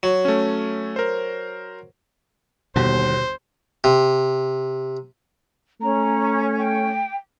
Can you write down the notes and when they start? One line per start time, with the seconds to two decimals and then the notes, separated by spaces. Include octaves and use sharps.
0.03 F#3
0.25 A3 C#4
0.96 A#4 C5
2.76 G1 D#2 B2 C5
3.84 C3
5.81 A3 C#4 A#5
6.58 G5